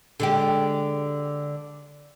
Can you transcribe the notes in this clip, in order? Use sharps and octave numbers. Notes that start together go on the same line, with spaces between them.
D3 G#3 G4